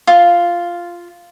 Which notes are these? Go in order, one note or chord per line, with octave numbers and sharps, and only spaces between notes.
F4